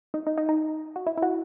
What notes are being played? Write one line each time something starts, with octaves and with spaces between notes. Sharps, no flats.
D#4
D#4
D#4
D#4
F#4
E4
E4
F#4